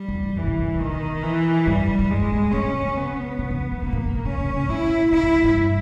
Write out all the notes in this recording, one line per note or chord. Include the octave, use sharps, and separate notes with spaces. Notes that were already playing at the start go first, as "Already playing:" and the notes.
Already playing: G3
E2
G2
G2 E3
B2
C#3
D#3
C#3
B2 D#3
E3
G#2 G3
G2
G2
G2
G#2 G#3
A#2
A#2
G#2
A#2 C#4
B2
C#3
B3
C#3
C#3
E3
D#3
C#3 A#3
A#2
G2
A#2
C#3 C#4
C#3
G#2
A#2 E4
B2 E4
A#2
G#2
G2